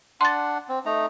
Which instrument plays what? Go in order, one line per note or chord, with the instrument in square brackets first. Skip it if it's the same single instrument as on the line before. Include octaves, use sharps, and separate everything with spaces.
[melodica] D4 F#5 [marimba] C6 A6
[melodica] C4
A3 D#4 A#5